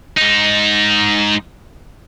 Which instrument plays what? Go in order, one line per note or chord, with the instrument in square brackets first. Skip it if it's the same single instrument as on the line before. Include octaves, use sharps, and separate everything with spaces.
[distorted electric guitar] G#2 D#4